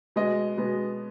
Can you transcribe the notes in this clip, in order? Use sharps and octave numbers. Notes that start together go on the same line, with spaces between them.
B2 G#3 B3 D#5
B2 G#3 B3